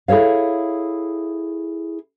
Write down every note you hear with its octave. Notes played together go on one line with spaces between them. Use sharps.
E4 G#4 A4 C#5 F5